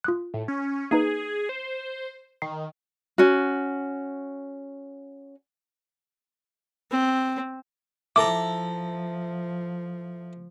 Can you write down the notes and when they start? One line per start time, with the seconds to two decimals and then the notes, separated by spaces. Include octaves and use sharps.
0.04 F4 D#6 F#6
0.34 A2
0.48 C#4
0.91 A#3 D#4 G#4 B4
1.49 C5
2.42 D#3 C7
3.18 C#4 F#4
6.91 C4
8.16 F3 E4 A4 A#5 D6